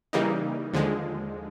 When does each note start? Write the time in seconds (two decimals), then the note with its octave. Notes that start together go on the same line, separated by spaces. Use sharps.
0.13 C#3 E3 G3 A#3 D#4
0.73 D#2 D3 F3 G#3